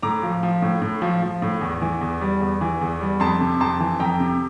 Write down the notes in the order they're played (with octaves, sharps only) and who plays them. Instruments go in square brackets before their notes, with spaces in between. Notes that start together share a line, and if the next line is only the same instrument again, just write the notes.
[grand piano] A2 A#5 D6
F3
F3
A2
A2
F3
F3
A2
E2
E3
E2
G3
E2
E3
E2
G3
F2 A5 C6
C3
F2 A5 C6
E3
F2 G5 A#5
C3